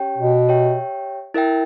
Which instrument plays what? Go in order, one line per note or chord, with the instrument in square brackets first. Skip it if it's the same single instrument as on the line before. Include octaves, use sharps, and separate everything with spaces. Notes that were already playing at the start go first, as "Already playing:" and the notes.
Already playing: [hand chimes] C#4 G4 C#5 G5
[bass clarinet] B2
[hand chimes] G4 C#5 E5 G5
E4 A#4 E5 G5